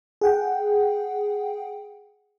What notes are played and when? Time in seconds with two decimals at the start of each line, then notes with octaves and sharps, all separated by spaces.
0.21 G#4 F#5 G5